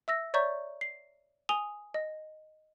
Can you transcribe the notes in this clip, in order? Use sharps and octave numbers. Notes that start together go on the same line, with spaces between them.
E5 E6 A#6
C#5 D5 E5 A#5 C#6 G6
C7
G#5 D#6 F7 G7
D#5